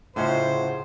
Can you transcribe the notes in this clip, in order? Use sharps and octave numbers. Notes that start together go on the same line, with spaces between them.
A2 C#3 F3 C#4 D#4 C5 F#5